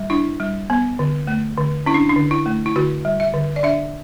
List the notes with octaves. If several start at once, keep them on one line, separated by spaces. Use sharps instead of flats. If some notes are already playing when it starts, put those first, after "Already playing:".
Already playing: G3
D4 E4
G3
B3
D3
A3
D3
C#4 E4
D4
D4
D3
E4
A3
E4
D3 F#4
G3
E5
D3
D5
D4 E5